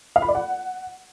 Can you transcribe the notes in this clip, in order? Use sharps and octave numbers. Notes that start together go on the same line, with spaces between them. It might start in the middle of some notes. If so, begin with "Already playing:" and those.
F5
B5
D5
F#5